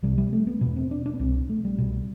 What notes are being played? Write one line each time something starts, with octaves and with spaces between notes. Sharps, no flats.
C2 C3 G3
G3
A3
B3
E2 B2 B3
C4
D4
D4
B3
C2 B2 C4
A3
G3
C2 B2